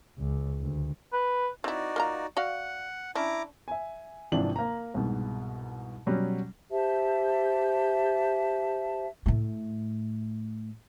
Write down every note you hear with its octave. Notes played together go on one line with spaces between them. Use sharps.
C#2
D2
B4
C4 D#4 E4 F#4 D5
A#3 F4 A#5
F#4 D5 F5 F#5
C#4 D4 E4 A#5 D6
E5 G#5
G#1 C3 E3 F3 D4 F#7
A#3 A#5
C2 G#2 B2
B2 F#3 G3 C#4
G4 C5 E5 A5
A2 A3